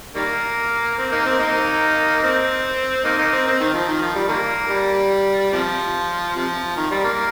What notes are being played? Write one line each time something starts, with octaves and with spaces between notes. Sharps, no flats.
D#3 G3 A#3
C4
A#3 D#4
C4
A#3 D#4
C4
A#3 D#4
A#3 D#4
C4
C4
D#3
F3
D#3
F3
G3
D#3 G3 A#3
G3
C3 F3
C3 F3
D#3
G3
A#3